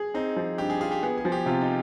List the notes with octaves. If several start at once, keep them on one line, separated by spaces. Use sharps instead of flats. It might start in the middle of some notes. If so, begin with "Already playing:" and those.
Already playing: G#4
C4 D#4
F3
G2 G4
G#4
F4 G#4
G4
B3 G#4
G#4
F3
G4
C3 F4
D#4